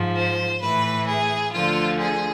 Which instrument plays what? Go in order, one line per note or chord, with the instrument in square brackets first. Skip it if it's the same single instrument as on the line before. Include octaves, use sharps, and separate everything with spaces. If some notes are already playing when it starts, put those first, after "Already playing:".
Already playing: [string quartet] G#2 F3
C5
A2 E3 B4
G#4
D2 D3 F3 F4
G#4